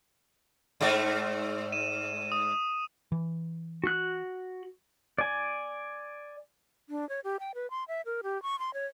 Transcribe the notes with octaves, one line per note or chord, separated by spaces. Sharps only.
G#2 A3 D5
D#7 E7
D#6
E3
F#4 F#6
D5 G#5
D4
C#5
G4
G5
B4
C6
E5
A#4
G4
C#6
C6
C#5